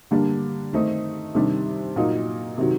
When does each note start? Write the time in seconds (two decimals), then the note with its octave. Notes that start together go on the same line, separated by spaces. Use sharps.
0.11 D3 G3 A#3 D4
0.73 D#3 A3 C4 D#4
1.35 C3 D#3 G3 D4
1.96 A#2 F#3 A#3 D#4
2.58 C3 D#3 F#3